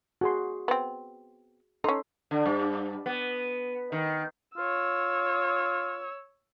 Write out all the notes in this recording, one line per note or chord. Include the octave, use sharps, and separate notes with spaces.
F#4 G#4 C6
B3 C4
C#4 D#4 A4 C6
D3
G2
B3
D#3
F4 C#5 E6